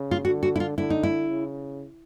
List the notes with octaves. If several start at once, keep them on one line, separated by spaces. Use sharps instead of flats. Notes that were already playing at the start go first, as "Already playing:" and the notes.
Already playing: C#3
F4
D3 F#4
F#4
E4
F4
D3 E4
D#4
E4
C#3